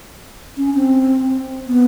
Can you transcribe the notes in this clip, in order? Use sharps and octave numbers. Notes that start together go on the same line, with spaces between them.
C#4
C4
B3